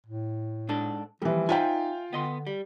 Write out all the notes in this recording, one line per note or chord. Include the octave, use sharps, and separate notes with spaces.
A2
G#2 D4 A4
D#2 E3 F3 G3
D#4 F4 C5 E5 F5 G5 G#5
D3 B3 D#5 C6
G3